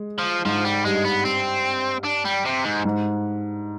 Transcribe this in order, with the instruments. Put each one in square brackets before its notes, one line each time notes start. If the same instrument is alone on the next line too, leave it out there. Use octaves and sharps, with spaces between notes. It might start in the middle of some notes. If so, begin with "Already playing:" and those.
Already playing: [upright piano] G#3
[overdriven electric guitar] F3
[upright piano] G#2 [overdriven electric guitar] F3
[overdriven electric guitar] G3
[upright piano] G2 [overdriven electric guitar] G#3
[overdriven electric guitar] B3
C4
D4
G3
C3
G#2
[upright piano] G#2